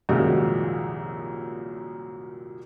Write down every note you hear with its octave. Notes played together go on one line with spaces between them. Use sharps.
C2 F#2 A#2 D#3 F3 G#3